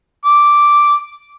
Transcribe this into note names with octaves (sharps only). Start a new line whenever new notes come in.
D6